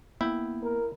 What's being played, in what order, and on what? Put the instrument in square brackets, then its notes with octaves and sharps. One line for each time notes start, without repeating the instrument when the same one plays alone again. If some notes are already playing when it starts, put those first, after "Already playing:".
[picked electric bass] A#3 B3 [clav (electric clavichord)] E4 E5 G5
[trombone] A#4